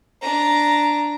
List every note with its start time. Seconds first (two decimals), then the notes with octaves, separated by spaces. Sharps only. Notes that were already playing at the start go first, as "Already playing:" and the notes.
0.22 D4 A#5